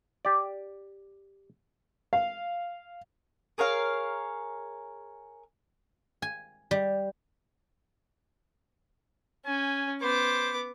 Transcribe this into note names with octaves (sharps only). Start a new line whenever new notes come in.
G4 D5
F5
G#4 A#4 C#5 F5
G#5
G3
C#4 G#5
B3 C5 D6